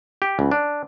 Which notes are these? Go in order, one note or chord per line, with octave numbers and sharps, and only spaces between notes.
G4
C#2
D4